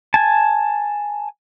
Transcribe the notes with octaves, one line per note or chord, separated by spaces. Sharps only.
G#5 A5